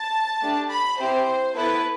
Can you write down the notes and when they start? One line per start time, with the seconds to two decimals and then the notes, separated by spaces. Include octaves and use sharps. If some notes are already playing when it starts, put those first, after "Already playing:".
Already playing: A5
0.42 A3 D4 G4
0.71 B5
0.99 C4 E4 G4 C5
1.55 B3 E4 A4 B4